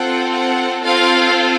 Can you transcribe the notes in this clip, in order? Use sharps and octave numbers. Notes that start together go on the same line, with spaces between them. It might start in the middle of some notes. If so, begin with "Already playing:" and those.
Already playing: C4 F4 A4 F#5
F#5
C4 F4 A4 F5